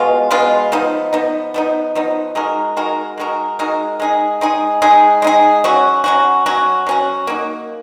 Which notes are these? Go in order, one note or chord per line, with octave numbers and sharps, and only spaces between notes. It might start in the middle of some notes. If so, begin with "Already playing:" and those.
Already playing: B2 G#3 B3 F4
B2 G#3 B3 F4
F3 B3 D#4
F3 B3 D#4
F3 B3 D#4
F3 B3 D#4
G#3 D#4 F#4 A#4
G#3 D#4 F#4 A#4
G#3 D#4 F#4 A#4
G#3 D#4 F#4 A#4
G#3 D#4 G#4
G#3 D#4 G#4
G#3 D#4 G#4
G#3 D#4 G#4
F#3 C#4 F#4
F#3 C#4 F#4
F#3 C#4 F#4
F#3 C#4 F#4
A#3 D#4 F#4